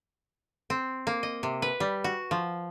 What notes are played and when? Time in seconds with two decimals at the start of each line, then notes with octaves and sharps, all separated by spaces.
0.70 C4
1.07 A#3
1.23 D#5
1.43 C3
1.62 B4
1.80 G3
2.04 F#4
2.31 F3